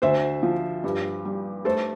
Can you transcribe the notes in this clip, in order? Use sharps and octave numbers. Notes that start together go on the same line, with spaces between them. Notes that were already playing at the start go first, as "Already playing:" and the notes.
D2 C5 E5
F3
G2
G3
A3 A4 C5